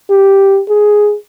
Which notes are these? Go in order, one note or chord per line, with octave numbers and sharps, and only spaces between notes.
G4
G#4